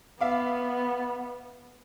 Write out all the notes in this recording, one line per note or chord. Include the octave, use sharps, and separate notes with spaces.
B3 E5 F5 D6